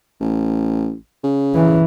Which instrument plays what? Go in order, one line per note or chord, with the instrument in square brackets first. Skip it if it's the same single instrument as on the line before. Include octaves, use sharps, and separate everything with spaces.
[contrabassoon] A1
C#3
[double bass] E3